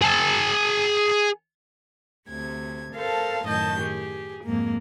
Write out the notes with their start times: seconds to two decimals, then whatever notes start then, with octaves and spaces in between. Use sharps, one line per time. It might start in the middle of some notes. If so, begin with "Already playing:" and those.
0.02 G#4 A5
2.29 D2 C3 G#6
2.93 A4 A#4 C5 F5 A5
3.45 F#2 A2 D#3 D#5 A5 G6
3.78 G4 G#4
4.45 F2 G#2 A#3